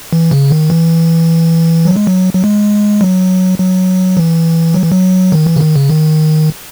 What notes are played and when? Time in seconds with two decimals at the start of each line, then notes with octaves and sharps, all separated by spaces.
0.13 E3
0.31 C#3
0.51 D#3
0.70 E3
1.85 F#3
1.96 G#3
2.07 F#3
2.34 F#3
2.44 G#3
3.01 F#3
3.59 F#3
4.17 E3
4.74 F#3
4.83 E3
4.92 F#3
5.32 D#3
5.46 E3
5.56 C#3
5.61 D#3
5.76 C#3
5.90 D#3